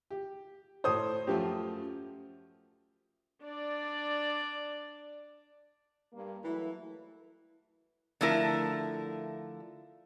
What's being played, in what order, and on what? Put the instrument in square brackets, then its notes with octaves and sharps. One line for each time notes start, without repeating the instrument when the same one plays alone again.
[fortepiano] G4
[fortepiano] A2 A4 [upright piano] C5 C#5 D#6
[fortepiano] F#2 F3 A3 [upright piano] G4
[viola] D4 D5
[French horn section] G2 A#3
[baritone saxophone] E3 [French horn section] F#3 A3 E4
[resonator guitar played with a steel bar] D3 F3 A3 E4 A#4